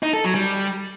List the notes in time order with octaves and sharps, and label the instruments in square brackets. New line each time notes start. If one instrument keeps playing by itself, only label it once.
[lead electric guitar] D#4
A4
F#3
G3